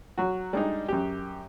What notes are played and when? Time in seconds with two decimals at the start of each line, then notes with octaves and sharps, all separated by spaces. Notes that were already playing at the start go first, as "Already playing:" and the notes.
0.18 F#3 F#4
0.53 G3 G#3 D4 D#4
0.88 F#2 G4